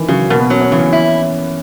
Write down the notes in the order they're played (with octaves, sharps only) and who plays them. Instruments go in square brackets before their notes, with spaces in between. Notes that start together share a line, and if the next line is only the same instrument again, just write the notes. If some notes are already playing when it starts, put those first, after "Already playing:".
Already playing: [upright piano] D#3 E3
[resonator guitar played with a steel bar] C#3 [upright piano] F#3
[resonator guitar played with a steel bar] B2 [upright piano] A#3
[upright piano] B3
[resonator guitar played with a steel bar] F#3 [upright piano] C#4
[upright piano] C#4
[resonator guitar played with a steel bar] C#3 [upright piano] E3
[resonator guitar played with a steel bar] E4